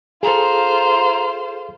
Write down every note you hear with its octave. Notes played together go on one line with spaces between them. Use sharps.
F4 G#4 A4 C5 A#5